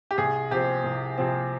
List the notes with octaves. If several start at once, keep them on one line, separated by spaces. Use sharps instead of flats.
G4
C2 G#4
C3 F3 C4 G4
C2
C3 F3 C4